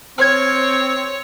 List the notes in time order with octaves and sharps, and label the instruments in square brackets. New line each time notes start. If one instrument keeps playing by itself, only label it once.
[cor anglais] C4 [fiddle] C#5 [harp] F6 G#6